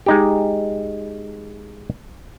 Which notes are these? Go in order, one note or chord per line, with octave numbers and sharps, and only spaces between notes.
G#3 D#4 G4